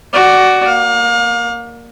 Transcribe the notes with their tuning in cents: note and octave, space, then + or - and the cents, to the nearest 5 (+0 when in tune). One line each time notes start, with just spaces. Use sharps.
F#4 +15 D5 +0
A#3 +0 F5 +35